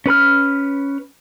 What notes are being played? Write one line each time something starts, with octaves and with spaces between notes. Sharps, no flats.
C#4 B4 B5 F6